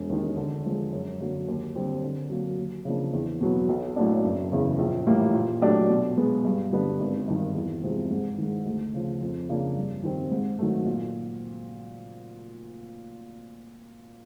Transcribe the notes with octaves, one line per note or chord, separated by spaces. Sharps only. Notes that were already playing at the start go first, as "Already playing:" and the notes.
Already playing: E1
D#2 D#3
D3
F3 G#3
F#2
D3 F#3 A#3
D#2
D3 G3 C4
D3
F#3 A#3
D#2
C#3 F3 A#3 D4
E2
B2 F#3 B3
B1
A2 F#3 A#3 D4
F#1
E2 C#3
A#1
A2 E3 G3 A#3
A#2
F#3 A3 D4 G4
B2
G#3 B3
G2
D3 G3 B3 D4
G#1
G2 D#3
E2
C3 F3 G#3
G#2
D#3 G#3
D2
C#3 F3
F2
C#3 F3 A#3 D4
G2
D#3 G3 C4
G#2
D#3 F#3 A3
A#2